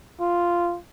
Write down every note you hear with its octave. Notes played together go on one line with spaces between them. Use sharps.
F4